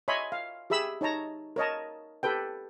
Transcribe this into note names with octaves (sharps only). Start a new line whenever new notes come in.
C#5 D#5 E5 G#5 B5 C6
F5
G4 G#4 E5 B5 E6
D#4 C#5 A5 A#5
A#4 C#5 D#5 A5
G4 A4 B4 G5